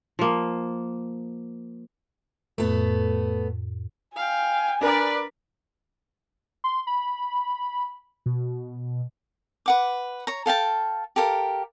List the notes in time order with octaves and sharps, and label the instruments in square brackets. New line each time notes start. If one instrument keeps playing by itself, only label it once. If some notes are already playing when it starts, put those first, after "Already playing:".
[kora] F3 A#3
[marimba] F2 A2 [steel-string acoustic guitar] A3 B3
[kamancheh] F5 G5 [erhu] G#5
[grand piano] D4 A#4 [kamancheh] B4 D5
[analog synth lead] C6
B5
B2
[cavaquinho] B4 F#5 D6
C#5 A#5
A4 F5 G5 A5
G4 A4 A#4 F5